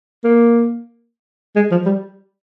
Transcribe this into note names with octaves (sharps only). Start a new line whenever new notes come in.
A#3
G#3
F3
G3